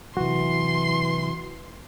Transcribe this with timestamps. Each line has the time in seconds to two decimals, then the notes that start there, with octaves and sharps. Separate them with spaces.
0.17 C3 E3 F#3 F#4 C6